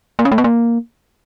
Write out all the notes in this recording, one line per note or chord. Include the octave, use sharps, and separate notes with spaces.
A#3
C#4
A3
B3
A#3